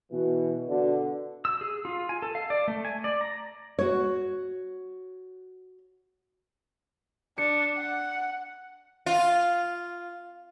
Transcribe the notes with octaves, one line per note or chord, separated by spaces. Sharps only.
B2 E3
B2 D3
E6
G#4
F4
G#5
A4
F5
D5
A3
G#5
D5
A#5
F#4 C#5
D4 C#7
F#5
F4